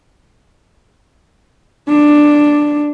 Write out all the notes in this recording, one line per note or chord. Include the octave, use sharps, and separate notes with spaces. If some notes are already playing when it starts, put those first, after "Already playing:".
D4